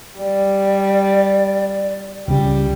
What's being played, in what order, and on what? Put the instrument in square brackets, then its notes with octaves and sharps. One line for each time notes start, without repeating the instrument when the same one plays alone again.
[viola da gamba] G3 [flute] D5
[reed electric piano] C#2 C#3 [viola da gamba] G3